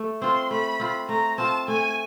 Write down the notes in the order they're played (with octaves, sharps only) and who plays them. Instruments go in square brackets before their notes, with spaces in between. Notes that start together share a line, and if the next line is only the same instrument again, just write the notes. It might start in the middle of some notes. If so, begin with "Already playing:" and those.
Already playing: [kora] A3
[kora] C4 F4 [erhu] C6
[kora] A3 [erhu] B5
[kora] C4 F4
[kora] A3 [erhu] A#5
[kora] C4 F4 [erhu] A5
[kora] A3 [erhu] G#5